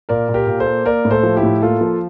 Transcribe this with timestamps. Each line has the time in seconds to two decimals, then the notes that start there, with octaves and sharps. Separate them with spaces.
0.09 A#2 A#4 D5
0.29 A#2
0.34 G4 A#4
0.47 A#2
0.59 A4 C5
0.66 A#3
0.85 A#3 A#4 D5
1.05 A2
1.11 A4 C5
1.23 F3
1.36 E4 G4
1.43 A2
1.62 A#3 F4 A4
1.81 F3